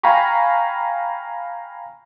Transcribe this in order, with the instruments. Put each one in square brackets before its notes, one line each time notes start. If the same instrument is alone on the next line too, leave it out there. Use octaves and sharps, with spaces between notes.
[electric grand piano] F5 G5 G#5 A#5 B5 C#6